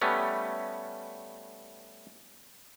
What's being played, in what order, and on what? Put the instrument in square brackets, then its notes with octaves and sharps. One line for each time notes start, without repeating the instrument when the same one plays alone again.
[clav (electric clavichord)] G3 A3 B3 C#4